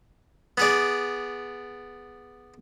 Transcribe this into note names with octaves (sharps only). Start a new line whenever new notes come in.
B3 G#4 D5